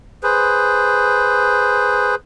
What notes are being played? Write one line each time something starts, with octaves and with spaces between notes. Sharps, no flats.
G#4 B4 C5